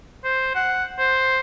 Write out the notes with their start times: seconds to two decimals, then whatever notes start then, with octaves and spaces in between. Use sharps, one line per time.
0.24 C5
0.55 F#5
0.99 C5